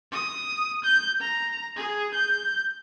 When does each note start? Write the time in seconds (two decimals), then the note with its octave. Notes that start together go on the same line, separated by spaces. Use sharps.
0.12 D#6
0.84 G6
1.21 A#5
1.77 G#4
2.15 G6